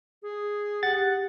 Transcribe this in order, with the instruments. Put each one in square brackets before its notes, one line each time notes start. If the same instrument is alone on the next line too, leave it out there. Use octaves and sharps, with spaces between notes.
[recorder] G#4
[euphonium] G4 [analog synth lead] F#5 [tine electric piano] A6